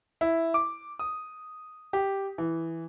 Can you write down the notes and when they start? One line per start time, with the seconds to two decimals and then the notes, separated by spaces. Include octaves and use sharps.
0.21 E4
0.54 D6
0.99 D#6
1.93 G4
2.38 E3